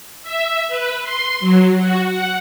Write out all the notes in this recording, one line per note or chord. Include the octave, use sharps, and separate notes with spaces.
E5
B4
C6
F#3
F#4
F#5